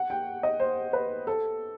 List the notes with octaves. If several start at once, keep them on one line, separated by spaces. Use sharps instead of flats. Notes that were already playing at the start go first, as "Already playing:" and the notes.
Already playing: F#5
G5
D#5
C5
B4
A4